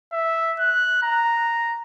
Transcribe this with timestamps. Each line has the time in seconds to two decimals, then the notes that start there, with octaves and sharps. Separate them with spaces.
0.13 E5
0.60 F#6
1.03 A#5